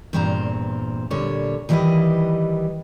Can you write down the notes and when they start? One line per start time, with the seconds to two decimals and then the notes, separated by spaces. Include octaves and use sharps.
0.13 E2 G2 A#2 C4 C5 A#5
1.10 A#2 D3 G3 C#5
1.69 D#3 E3 G3 A4 B4 D#5